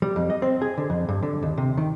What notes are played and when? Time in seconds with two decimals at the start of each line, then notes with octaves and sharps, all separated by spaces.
0.02 G3
0.16 F2
0.30 D#5
0.42 C4
0.62 G#4
0.78 D3
0.90 F2
1.09 G2
1.23 D3
1.43 D#2
1.58 C3
1.77 D#3